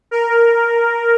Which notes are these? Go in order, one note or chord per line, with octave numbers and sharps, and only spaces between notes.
A#4